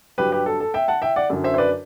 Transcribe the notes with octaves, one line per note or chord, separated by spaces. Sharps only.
G2 F#3 G4 B4
G4 B4
A4
A4
E5 G5
F#5 A5
E5 G5
D5 F#5
F#2 D3 F#3
C5 E5
C5
B4 D5